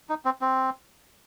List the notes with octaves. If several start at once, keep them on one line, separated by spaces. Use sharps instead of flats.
D#4
C4
C4